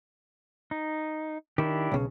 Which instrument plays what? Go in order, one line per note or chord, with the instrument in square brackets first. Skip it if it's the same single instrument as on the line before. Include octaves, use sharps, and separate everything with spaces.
[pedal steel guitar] D#4
[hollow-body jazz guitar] D#3 [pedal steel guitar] D4 E4 G4
[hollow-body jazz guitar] B1 C#3